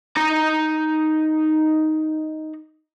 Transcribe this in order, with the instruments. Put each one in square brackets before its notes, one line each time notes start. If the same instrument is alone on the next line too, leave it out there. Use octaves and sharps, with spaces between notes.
[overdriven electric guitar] D#4 A#5